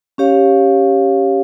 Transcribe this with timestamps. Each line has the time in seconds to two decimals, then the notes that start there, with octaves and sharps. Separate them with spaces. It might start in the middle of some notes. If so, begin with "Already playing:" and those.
0.18 C#4 G4 C#5 F5